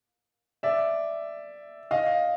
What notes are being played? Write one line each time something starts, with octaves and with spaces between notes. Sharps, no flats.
D5 E5
D#5 F5